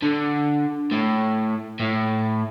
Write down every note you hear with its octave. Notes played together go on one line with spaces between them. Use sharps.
D3
A2
A2